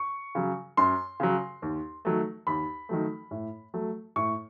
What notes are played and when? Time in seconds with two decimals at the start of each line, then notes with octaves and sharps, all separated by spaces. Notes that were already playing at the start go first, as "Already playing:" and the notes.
Already playing: C#6
0.35 C#3 F#3
0.77 F#2 C6
1.20 C#3 F#3
1.62 D#2
2.05 D#3 F#3 A3
2.47 D#2 B5
2.89 D#3 F#3 A3
3.31 A2
3.74 F#3 A3
4.16 A2 C#6